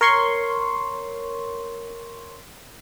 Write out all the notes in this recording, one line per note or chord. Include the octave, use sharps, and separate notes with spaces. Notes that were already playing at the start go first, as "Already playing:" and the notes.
A#4 C#5 C6 C#6